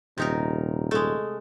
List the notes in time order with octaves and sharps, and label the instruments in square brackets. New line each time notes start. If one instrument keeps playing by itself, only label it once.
[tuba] D#1 [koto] C3 D#4 A#4
[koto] G#3 A3